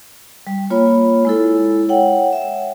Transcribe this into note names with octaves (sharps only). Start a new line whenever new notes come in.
G3
A#3 F4 C#5 B5
G#3 E4 A4
C#5 F#5 G5
E5